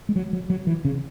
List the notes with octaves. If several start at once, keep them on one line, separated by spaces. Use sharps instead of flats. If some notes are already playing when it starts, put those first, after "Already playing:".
G#3
F#3
F#3
F#3
E3
C#3